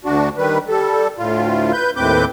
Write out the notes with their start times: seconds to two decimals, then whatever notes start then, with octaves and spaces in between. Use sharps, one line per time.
0.05 D2 D4 F#4
0.38 D#3 G3 B4
0.69 G3 A4
1.19 D2 A2 F4
1.72 B4 G6
1.96 D#2 A2 C4 B4 D6 G6